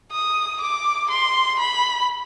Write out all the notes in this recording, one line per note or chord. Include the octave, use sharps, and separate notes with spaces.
D#6
D6
C6
B5